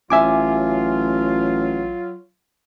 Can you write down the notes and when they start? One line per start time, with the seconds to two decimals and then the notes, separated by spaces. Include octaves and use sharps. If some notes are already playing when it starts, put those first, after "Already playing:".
0.10 A1 F#3 F4 E5 G#5 D6